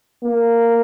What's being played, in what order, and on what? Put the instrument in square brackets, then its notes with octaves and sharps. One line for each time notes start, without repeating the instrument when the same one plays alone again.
[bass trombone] A#3